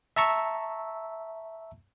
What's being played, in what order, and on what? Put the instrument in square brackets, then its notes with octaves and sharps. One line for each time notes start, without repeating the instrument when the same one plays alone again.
[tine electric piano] E5 A5 A#5 C#6 E6